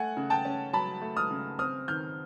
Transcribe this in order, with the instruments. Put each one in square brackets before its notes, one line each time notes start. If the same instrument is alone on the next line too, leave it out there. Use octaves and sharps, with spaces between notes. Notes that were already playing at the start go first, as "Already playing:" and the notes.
Already playing: [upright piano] A3 F#5 G#5
C#3
G5 A5
C#4
F#3 A5 B5
A3
D#6 F6
C#3
C4 D#6 F6
D#3 F6 G6